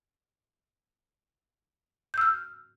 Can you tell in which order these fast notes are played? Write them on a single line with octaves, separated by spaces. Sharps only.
G6 E6 F6